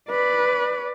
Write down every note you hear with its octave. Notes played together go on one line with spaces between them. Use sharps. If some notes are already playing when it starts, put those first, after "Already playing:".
B4 D5